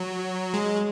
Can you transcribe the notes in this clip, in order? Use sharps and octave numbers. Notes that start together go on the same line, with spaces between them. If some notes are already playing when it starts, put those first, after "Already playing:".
Already playing: F#3
G#3